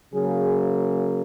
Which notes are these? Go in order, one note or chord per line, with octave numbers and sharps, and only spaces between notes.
C#3 F#3 A#3 G#4